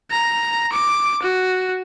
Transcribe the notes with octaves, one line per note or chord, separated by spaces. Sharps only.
A#5
D6
F#4